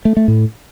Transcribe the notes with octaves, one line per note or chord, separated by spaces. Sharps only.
A3
A3
A2